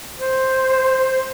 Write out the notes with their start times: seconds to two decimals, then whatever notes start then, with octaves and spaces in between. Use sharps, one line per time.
0.18 C5